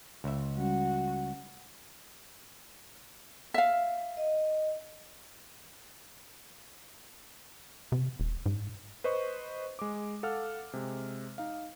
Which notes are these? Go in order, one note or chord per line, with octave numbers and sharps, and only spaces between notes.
C#2 E5
G3 C#4 F#4
E5 F5
D#5
C3
E1
G#2
B4 C5 D#5 C#6
G#3 D6
A4 F5 F#5 F6
C3 G#3
D#4 F5